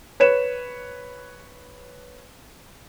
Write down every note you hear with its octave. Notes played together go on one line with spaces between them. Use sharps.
B4 C#5 E7